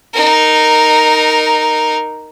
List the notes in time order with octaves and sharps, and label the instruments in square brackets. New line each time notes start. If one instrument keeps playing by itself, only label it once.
[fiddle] D#4 A#4